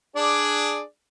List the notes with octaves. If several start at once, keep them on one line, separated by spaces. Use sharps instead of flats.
D4 G#4 D5